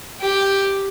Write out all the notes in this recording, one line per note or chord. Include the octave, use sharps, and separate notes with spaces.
G4